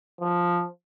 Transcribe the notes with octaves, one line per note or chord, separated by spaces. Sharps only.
F3